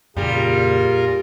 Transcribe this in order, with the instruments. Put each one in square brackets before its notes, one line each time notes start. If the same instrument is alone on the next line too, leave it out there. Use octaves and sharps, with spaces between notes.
[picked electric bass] F2 C#3 A#3 [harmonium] A#2 G#4 [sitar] G3 [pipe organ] F4 A#4